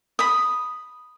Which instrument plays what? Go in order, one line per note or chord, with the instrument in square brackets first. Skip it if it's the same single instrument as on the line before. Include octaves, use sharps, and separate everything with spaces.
[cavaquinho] B5 D#6